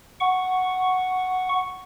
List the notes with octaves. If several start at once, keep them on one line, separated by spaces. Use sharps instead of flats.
F#5 C#6